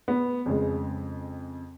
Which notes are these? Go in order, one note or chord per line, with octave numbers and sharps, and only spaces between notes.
B3
F2 C#3 G#3